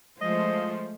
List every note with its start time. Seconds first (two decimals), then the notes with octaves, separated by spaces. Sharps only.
0.21 F3 G#3 A3 C5 D#5